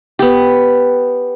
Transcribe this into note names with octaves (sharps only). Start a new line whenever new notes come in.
B3 G4